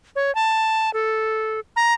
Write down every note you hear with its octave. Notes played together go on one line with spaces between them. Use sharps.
C#5
A5
A4
A#5